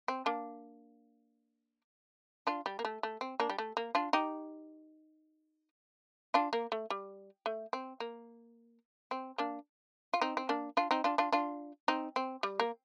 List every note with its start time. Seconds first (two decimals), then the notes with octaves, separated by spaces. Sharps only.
0.08 C4
0.26 A#3 D4
2.47 D4 F4
2.66 G3
2.79 A#3
2.85 A3
3.03 A3
3.21 C4
3.40 A#3 D4
3.50 G3
3.58 A3
3.77 A#3
3.95 D4 F4
4.13 D#4 G4
6.34 D4 F4
6.53 A#3
6.72 A3
6.90 G3
7.46 A3
7.73 C4
8.00 A#3
9.11 C4
9.38 A#3 D4
10.14 F4
10.21 C4 D#4
10.37 C4
10.49 A#3 D4
10.77 D4 F4
10.91 C4 D#4
11.04 D4 F4
11.18 D4 F4
11.32 D4 F4
11.88 C4 D#4
12.16 C4
12.43 G3
12.60 A#3